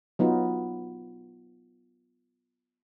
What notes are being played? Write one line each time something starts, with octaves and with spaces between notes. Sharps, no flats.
F#3 B3 D#4 F4